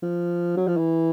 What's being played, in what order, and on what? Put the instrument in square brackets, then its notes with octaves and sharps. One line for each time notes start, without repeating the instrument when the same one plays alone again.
[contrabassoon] F3
F#3
F3
E3